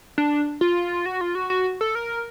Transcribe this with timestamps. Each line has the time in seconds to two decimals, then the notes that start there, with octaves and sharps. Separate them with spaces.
0.18 D4
0.61 F4
1.06 F#4
1.21 F4
1.35 F#4
1.50 F#4
1.81 A4
1.95 A#4